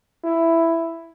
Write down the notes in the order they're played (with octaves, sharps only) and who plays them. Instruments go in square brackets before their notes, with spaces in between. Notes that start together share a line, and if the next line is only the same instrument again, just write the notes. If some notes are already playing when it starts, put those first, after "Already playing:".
[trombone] E4